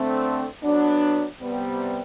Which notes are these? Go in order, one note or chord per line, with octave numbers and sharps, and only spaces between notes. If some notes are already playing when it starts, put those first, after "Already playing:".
Already playing: D3 A3 C4
F#3 B3 D4
C3 G3 B3